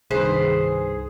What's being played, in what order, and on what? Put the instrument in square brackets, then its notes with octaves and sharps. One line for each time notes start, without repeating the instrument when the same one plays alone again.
[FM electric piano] C2 G2 D#3 [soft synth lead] G#4 [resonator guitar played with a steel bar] B4 C5